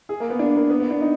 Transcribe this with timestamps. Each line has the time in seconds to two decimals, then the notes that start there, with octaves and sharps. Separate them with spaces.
0.09 G#4
0.20 A#3
0.30 B3
0.39 D4
0.56 A#3
0.70 B3
0.80 B3
0.91 D4
1.01 D#4